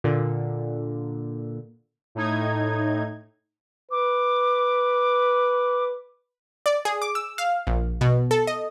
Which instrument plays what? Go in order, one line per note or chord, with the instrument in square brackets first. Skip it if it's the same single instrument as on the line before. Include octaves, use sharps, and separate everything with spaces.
[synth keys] A#2 D3
[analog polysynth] A2 D#4 G#6
[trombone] B4 [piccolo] D6
[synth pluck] D5
G#4
D6
E6
F5
A#1
B2
A4
D#5